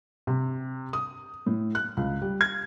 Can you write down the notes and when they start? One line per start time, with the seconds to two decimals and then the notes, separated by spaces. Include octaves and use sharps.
0.27 C3
0.93 D#6
1.46 A2
1.75 F#6
1.97 C#2
2.22 G3
2.41 G#6